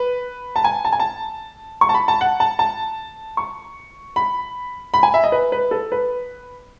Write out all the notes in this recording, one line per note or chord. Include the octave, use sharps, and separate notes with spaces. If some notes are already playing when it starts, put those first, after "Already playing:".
Already playing: B4
A5
G#5
A5
G#5
A5
C#6
A5
B5
A5
F#5
A5
A5
C#6
B5
B5
G#5
E5
D#5
B4
B4
A4
B4